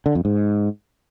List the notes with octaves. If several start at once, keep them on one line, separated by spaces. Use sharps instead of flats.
D3
F2
G#2